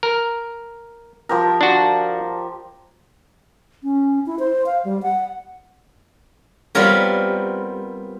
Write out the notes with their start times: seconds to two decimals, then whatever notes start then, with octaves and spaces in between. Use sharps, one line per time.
0.03 A#4
1.29 F3 G4 A#4
1.61 D4 F#4
3.83 C#4
4.26 E4
4.39 C5
4.66 F5
4.85 G3
5.02 F#5
6.75 G3 B3 C4 F4 A#4 C#5